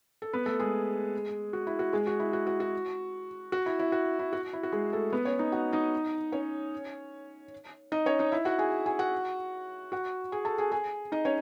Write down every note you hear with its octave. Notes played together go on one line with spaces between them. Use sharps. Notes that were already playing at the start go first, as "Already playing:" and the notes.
A4
B3 B4
A3 A4
G#3 G#4
F#4
E4
F#4
G#3 G#4
F#4
E4
F#4
F#4
F#4
F#4
E4
E4
F#4
E4
F#4
E4
F#4
G#3 G#4
A3 A4
B3 B4
C#4 C#5
D#4 D#5
F#4 F#5
D#4 D#5
C#4 C#5
D#4 D#5
C#4 C#5
D#4 D#5
E4 E5
F#4 F#5
G#4 G#5
G#4 G#5
F#4 F#5
F#4 F#5
G#4 G#5
A4 A5
G#4 G#5
G#4 G#5
D#4 D#5
C#4 C#5